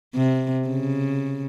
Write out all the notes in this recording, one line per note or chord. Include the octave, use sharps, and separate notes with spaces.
C3
C#3